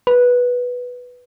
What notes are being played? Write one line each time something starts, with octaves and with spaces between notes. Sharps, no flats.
B4